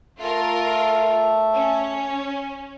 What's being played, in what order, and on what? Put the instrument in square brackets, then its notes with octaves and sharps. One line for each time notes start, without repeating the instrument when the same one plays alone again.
[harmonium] A3 A4 E5 [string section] F4 A#4
[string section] C#4